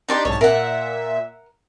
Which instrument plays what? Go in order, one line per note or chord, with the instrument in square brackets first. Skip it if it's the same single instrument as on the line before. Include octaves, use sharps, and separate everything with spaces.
[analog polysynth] D4 G4 D#5 [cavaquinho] D#4 D5 C6
[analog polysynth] B1 G#2 A5 [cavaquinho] C#5
[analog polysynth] A#2 E5 [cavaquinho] A#4 F#5